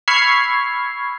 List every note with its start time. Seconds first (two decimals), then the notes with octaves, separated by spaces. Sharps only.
0.08 B5 C#6 E6 F6 G#6 C7